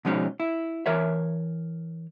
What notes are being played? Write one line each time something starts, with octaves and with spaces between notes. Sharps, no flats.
B2 F3 G#3 C#4 D#4
E4
E3 A#4 C#5 E5